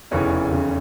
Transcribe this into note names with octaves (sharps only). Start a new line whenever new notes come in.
F1 E2 C#3 E3 C#4
F1 E2 C#3 E3